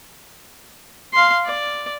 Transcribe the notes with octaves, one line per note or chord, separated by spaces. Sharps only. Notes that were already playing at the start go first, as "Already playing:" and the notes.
F5 C6
D5